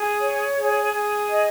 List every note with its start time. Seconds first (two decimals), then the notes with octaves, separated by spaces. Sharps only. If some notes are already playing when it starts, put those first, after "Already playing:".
Already playing: G#4
0.21 C#5
0.58 G#4
0.94 G#4
1.31 D#5